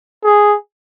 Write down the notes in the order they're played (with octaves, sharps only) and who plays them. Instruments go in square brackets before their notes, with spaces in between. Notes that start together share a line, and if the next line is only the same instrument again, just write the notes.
[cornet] G#4